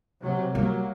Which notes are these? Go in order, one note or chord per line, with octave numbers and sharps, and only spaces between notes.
C3 F#3
F#3 G3 A#3